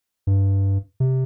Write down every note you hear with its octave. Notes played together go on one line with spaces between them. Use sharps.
G2
C3